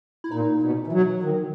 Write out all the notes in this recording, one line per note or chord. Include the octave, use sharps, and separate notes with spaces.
E4
A#2 D#4
B2
E3
F#3
D#3